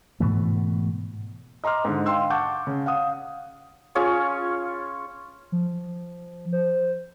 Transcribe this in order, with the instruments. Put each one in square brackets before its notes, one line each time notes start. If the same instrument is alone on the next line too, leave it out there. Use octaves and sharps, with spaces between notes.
[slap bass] G#2 B2 E3 A3
[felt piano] D#5 A#5 C6 D6 F6
G#2 D3
F5 G5 C6 E6
F#5 A5 C#6 D6 G6
C#3
F5 F#5 D#6
[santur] C#4 F4 G#4 C#5
[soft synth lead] F3
C5